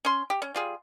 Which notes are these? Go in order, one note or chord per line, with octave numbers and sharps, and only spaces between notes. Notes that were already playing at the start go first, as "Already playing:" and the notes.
C#4 C6
G4
C#4
G3 F4 G#4